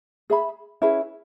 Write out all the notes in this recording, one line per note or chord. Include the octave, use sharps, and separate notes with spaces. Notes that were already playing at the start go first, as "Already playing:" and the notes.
G#4 E5 B5
C#4 E4 G#4 B4